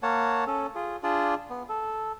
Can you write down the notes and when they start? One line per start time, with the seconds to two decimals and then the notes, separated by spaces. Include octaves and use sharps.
0.03 A#3 C#5 F#5 A5
0.47 C#4 A4
0.75 F4 G#4
1.03 D4 F4 G#4 D5
1.50 B3
1.69 A4